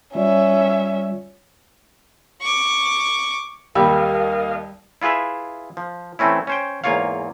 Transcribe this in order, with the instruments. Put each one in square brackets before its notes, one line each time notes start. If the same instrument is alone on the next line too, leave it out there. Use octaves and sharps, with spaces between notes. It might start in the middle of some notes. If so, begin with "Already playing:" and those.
[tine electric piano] G3 F4 D5 [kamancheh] C#4 E5
[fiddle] C#6 D6
[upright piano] D#2 E6 [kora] G3 [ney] A#4 [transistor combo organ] D#5 F5
[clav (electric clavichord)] E4 F4 G#4 B4 E5
F3
E3 A3 C4 C#4 E4
C#4 C5 G5
E2 G#2 A#3 F4 C#5 F5